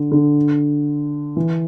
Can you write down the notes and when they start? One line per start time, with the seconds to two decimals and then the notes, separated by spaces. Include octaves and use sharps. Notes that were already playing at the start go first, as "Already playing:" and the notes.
Already playing: D3
0.12 D3
1.36 E3